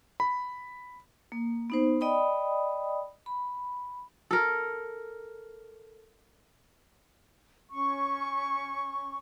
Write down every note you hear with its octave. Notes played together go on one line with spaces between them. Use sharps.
B5
A#3
B3 D#4 C5
D5 D#5 G5 B5 D#6
B5
A4 A#4
C#4 C#6